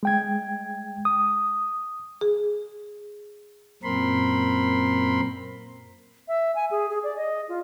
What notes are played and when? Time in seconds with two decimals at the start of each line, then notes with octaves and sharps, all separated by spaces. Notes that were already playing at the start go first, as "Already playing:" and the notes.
0.03 G#3 G5 G#6
1.05 D#6
2.21 G#4
3.83 F#2 A#2 C4 A#4 B5 C6
6.28 E5
6.55 G#5
6.71 G#4
6.90 G#4
7.04 D5
7.17 D#5
7.49 F4